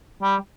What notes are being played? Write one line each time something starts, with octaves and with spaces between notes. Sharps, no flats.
G3